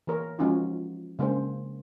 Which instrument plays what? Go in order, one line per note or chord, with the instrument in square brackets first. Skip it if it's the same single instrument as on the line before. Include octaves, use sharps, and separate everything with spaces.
[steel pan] E3 A#3 A#4 C#5
F3 G#3 C#4 D#4 F4 F#4
C#3 G#3 A#3 D4 C5